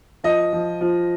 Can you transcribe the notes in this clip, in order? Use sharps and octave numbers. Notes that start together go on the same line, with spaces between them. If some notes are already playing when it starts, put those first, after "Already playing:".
F3 D#5
F3
F3